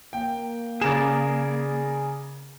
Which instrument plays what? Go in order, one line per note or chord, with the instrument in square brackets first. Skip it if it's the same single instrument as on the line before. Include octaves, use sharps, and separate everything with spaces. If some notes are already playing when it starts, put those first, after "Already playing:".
[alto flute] A#3 [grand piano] G5
[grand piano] C#3 E7 [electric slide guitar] G#4 A#4 D5